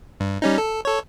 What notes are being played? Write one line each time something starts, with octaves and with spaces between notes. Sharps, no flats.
G2
G3 C#4 D#4
A4
A4 C#5